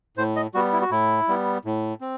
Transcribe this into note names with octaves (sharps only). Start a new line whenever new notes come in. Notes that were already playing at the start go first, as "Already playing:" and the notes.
A2 C5
D#5
G3 B3 F#4
E4
F#4
A2 E4
G3 B3
A2
C4